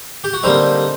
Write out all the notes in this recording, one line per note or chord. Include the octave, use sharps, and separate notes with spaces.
G4
F#4
D3 G3 A#3 C4 D#4